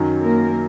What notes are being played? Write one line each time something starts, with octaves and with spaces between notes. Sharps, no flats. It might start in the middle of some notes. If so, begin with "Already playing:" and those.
Already playing: F#2 D#3 F#3
A#3 A#4